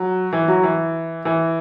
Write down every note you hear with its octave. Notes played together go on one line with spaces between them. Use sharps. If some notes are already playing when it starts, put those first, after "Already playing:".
Already playing: F#3
E3
F#3
E3
E3